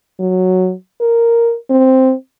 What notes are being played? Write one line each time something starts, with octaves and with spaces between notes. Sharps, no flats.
F#3
A#4
C4